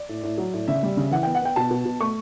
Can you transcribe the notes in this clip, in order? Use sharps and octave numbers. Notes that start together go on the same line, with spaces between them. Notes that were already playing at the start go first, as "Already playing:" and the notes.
Already playing: D5
A2
A2
F#3
A2
C#3 E5
G3
C#3
E3 F#5
B3 G5
F#5
B3 G5
B2 A5
B2
B2
A3 C#6